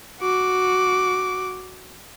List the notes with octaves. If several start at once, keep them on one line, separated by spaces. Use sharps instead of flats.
F#4 D6